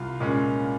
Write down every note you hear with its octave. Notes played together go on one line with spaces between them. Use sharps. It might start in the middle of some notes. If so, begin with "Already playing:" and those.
Already playing: C2 F4 F5
A#2 G#3 C#4